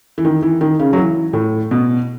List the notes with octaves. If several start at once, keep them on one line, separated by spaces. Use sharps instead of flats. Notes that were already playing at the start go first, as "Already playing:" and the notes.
E3
D#3
E3
D#3
C#3
F#3
E3
A2
B2